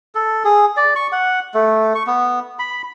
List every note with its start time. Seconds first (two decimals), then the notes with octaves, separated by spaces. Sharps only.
0.15 A4
0.45 G#4
0.77 D5
0.96 C#6
1.12 F#5
1.54 A3
1.95 C#6
2.07 B3
2.59 B5